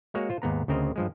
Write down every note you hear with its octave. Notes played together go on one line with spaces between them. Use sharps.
G#3 A#3 F#4 C#5 F#5
F4 C5
D#2 G#2 B3 A#5
D2 C#3 C4 A#4 D#5
G2 F3 G#3